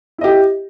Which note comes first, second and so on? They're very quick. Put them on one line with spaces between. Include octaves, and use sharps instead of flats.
E4 D#5 G4